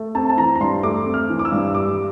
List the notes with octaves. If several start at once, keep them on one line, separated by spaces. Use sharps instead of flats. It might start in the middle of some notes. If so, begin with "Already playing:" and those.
Already playing: A3
C4 A5
A5
E3 A#5
A#5
G2 C6
C6
A3 D6
C4
F6
E3
D6
E6
G2
G3 D6